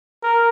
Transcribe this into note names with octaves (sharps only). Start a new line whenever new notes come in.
A#4